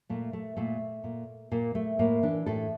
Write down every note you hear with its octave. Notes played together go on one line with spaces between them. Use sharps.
A#2 A3
A3
A#2 A3
A#2
A#2 A#3
A3
A2 A#3
E3 D4
A2 A4